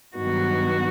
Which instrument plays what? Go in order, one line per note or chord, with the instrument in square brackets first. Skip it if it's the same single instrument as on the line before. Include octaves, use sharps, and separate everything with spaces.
[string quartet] G2 D#3 F#3 B3 D#4 F#4